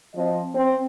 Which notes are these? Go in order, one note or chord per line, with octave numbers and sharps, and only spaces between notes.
F3 C4 D#5
C4